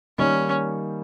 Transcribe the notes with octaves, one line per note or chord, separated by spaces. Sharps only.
D#3 G3 A#3 C#4 D#4